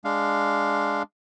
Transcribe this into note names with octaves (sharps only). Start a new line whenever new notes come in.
G#3 D4 F5